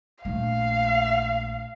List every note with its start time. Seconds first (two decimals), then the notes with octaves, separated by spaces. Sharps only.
0.25 A#1 A3 F5